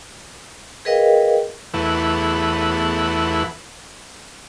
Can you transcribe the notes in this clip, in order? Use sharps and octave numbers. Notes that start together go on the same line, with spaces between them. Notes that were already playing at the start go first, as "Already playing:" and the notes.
G#4 A#4 B4 D#5 F5 G5
E2 A3 E4 B4 F#5